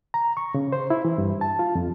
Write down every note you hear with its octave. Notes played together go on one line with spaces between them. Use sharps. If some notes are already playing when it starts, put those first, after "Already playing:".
A#5
C#6
C#3
C5
E4
E3
G2
A5
F4
F2